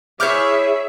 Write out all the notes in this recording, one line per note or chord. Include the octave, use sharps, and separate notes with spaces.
E4 G#4 C#5 E5 D6 F6 G6